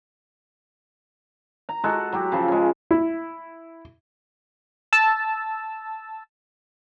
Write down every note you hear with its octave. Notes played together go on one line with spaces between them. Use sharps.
A#5
G#3 F#4 A4
F#3 F#4 G4
C#3 F3
G#3 C#4
E4
A5 E6